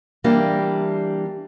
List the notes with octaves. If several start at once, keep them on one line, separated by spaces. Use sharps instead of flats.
E3 G3 A#3 D4 G4